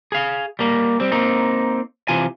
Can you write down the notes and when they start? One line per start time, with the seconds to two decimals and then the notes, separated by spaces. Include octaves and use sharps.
0.12 G#4 F5
0.59 G3 A#3
1.00 G3 C4
1.12 A#3 C4 D#4
2.08 C3 E3 F4 G#5